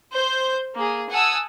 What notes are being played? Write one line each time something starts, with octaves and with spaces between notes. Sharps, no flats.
C5 G6
A#3 G#4
F#5 G#5 A5 D#6 E6